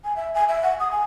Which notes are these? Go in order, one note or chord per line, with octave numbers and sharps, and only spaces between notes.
G#5
E5
G#5
E5
F#5
D#6
G#5